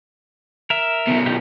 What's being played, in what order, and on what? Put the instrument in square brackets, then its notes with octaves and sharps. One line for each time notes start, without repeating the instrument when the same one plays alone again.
[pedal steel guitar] A#4 E5
[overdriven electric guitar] B2 D#3
[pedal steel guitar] D4 D#4 G4